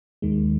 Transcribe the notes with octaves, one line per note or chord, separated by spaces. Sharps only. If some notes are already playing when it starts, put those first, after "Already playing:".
D#2 D#3 G#3